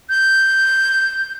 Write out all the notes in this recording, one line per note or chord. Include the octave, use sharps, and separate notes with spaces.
G6